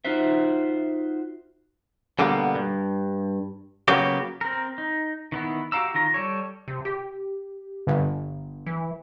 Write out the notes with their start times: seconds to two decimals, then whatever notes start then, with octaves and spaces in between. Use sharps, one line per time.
0.05 D#4 F4 F#4 C5 E5
2.19 B2 D3 G3 A#3 B3
2.55 G2
3.88 C#3 F#3 A#3 B3 F#4 G4
4.41 C4 A#4
4.78 D#4
5.32 D#3 B3 E4
5.72 F#4 G4 F5 A#5 E6
5.94 D#3 F4 A#5
6.14 G3 A4 C#5
6.68 C3
6.85 G4
7.87 G1
8.66 E3